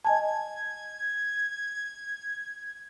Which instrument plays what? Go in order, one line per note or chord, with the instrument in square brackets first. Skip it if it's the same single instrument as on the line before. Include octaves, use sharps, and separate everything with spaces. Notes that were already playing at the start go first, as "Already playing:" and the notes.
[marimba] D#5 G#5 A5 [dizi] G#6